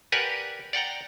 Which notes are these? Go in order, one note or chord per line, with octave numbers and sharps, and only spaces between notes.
G4 A#4 B4 D5 F#5 G#5
D5 F#5 G5 A#5